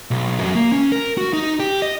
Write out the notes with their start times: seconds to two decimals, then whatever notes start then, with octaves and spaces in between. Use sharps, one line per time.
0.11 B1
0.40 F#2
0.55 A#3
0.72 C#4
0.92 A#4
1.17 F#4
1.33 D#4
1.60 G4
1.82 D#5